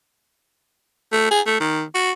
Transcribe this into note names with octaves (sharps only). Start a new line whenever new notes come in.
A3
G#4
A3
D#3
F#4